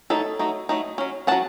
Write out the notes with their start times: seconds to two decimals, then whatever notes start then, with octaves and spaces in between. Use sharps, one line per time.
0.10 F#3 A3 D#4 A4 C#5
0.39 F#3 A3 D#4
0.69 F#3 A3 D#4
0.98 F#3 C#4
1.27 F#3 C#4 F#5 A5